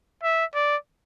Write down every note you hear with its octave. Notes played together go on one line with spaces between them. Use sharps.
E5
D5